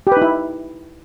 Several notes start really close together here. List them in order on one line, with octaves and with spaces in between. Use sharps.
G4 B4 D#4 E4